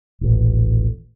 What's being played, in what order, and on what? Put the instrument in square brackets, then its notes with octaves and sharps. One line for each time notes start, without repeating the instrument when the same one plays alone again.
[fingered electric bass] D#1 A1